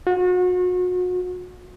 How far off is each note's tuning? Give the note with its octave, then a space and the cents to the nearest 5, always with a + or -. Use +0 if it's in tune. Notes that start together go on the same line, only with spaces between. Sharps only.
F#4 -35